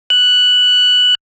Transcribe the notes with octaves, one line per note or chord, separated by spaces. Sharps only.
F#6